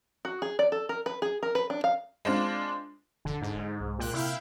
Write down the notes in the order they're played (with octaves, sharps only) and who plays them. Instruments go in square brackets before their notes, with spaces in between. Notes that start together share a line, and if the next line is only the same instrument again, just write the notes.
[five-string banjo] F#4
G#4
D5
A4
A#4
B4
G#4
A#4
B4
D4
F5
[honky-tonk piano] G#3 C4 D4 F4
[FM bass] D#1 [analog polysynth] D3
[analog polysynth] G#2
[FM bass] D#4
C2
[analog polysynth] A#2 G5 F#6
[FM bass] C3 [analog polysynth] E4 F5 G5